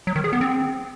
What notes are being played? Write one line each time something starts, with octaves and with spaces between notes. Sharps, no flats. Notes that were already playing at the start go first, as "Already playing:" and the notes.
F#3
D#3
G#4
B3
C4